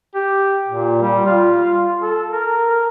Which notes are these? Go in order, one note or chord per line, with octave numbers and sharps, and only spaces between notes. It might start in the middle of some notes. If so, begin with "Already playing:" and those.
G4
A#2
G3
F4
A4
A#4
A#4